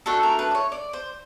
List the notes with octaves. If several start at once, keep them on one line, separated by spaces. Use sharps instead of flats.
A3 D4 F#4 A4
A#4
B4
D5
C#5
D5
C5